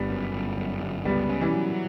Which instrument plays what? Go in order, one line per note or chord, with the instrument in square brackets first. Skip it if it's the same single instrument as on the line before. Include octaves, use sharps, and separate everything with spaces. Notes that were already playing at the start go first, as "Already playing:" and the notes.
Already playing: [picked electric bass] G1 [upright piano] G3 B3
[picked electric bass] F#2
G1
F#2
G1
[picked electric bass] C#2 [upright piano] G3 B3
[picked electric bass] C#4
[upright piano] E3 G3
[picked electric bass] F#3